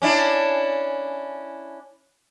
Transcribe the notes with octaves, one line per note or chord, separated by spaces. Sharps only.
C#4 D4 E4